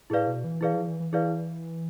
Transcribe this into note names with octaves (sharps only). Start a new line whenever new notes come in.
A2 E4 G#4 B4 D5 F5
B2
E3
E3 E4 G#4 B4 D5 F5
F3
E3
E3
E3 E4 G#4 B4 D5 F5